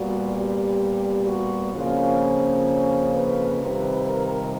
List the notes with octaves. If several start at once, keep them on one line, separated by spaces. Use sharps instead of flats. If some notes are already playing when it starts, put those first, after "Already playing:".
Already playing: A#2 G3 B3 F#4
G4
F#4
F2 C#3 F3 A#3 C#4 F4
B4
F2 C3 D#3 G3
A#4